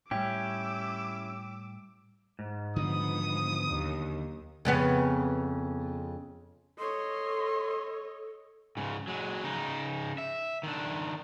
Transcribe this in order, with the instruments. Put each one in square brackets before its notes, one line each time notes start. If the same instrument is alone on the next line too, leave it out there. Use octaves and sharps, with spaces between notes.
[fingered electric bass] A2 G3 [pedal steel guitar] C#4 E4 G4 [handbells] G5 [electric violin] D6 E6
[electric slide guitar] G#2
[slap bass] D3 D#3 F#3 [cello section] F3 B3 [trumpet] D#6
[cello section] D#2
[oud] F2 C#3 B3
[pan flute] A4 [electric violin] C#5 D#5 [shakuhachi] C6
[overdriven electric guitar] G#2 C#3
F#3 G#3
C#3 D#4
E5
D#3 D4